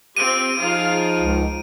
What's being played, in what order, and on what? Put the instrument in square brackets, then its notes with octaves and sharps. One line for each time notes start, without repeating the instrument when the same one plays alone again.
[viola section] C4 G4 [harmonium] F4 [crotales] D7 D#7
[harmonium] F3 D#4 [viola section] F4 G#4 F5
[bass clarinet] C#2